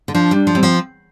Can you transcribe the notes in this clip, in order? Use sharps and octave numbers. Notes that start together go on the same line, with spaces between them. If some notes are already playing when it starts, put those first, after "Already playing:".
D3
F3 D4
G3 D4
F3
G3 C4
F3